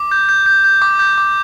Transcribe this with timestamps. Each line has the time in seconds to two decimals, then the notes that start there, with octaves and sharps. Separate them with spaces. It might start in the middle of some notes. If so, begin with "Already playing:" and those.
Already playing: D6
0.11 G6
0.29 G6
0.46 G6
0.64 G6
0.82 D6
0.99 G6
1.18 D6